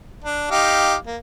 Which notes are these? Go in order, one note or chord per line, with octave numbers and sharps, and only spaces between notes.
D4
D#4 G4 F5
A#3